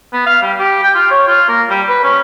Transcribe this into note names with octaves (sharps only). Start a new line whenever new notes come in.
B3
F5
G3
G4
G5
F4
C#5
F4
A#3
G3
B4
C#4